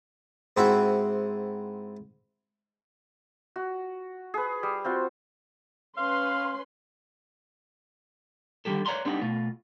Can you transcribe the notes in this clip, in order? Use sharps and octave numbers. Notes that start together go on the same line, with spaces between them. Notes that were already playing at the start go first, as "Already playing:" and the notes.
G#2 C4 E4 F#4 E5
F#4
G#4 B4
G3
C4 F4 F#4
C#4 B4 F5 C6
D3 D#3 G3 G4 A4
B4 C#5 D5 A#5 C6
G3 B3 C4 D4 D#4
B2 A3 F4